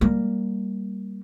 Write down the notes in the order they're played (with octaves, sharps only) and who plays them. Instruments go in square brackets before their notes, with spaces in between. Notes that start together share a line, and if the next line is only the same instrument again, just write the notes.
[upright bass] G3 A#3